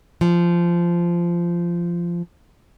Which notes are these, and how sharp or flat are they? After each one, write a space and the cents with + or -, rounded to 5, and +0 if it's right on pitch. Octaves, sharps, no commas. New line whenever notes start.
F3 -15